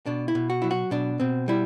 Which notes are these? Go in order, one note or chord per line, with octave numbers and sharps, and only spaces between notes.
B2 D4
E4
B2
F#4
F#3 E4
F#4
B2 D4
B2 C4
G3 E4